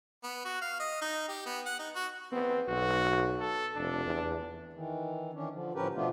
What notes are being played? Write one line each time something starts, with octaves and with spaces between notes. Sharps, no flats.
B3
F#4
F5
D#5
D#4
G4
B3
F#5
D#4
F#4
B3 C4
B1 F#4
A4
F1 D4
E2
D#3 E3
D#3 E3 C#4 D4
D3 F3
A2 F3 C#4 G4 A#4 B4
B2 F3 A3 B3 D4 F4